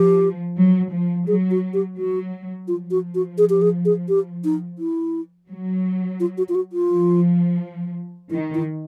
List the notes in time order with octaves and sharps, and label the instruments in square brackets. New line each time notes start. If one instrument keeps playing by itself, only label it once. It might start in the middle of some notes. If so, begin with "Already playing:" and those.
Already playing: [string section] F3 [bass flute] G4
[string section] F#3
F3
[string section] F#3 [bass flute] G#4
[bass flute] F#4
G4
[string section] F#3 [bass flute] F#4
[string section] F3 [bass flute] F4
[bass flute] F#4
F#4
G#4
G4
G#4
G#4
G4
D#4
E4
[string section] F#3
[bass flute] F4
F#4
F4
F#4
F4
[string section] F3
[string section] D#3 [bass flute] E4
[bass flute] E4